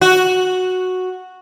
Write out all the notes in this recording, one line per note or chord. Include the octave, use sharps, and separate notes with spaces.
F#4